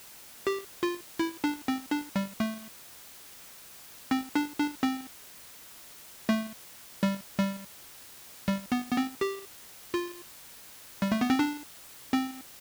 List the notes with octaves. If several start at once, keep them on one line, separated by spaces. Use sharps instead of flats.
G4
F4
E4
D4
C4
D4
G3
A3
C4
D4
D4
C4
A3
G3
G3
G3
B3
B3
C4
G4
F4
G3
A3
B3
C4
D4
C4